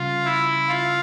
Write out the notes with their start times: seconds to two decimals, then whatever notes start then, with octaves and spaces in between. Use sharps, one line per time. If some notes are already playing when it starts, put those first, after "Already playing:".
Already playing: C#3 G3 C#4 F4
0.25 E4
0.69 F4